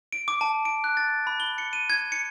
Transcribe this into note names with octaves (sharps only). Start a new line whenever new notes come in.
D7
D6
A5
D7
F#6
A6
B5
G7
C#7
D#7
G#6
C#7